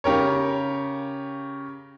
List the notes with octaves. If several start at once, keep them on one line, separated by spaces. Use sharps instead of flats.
C#3 G4 A#4 C#5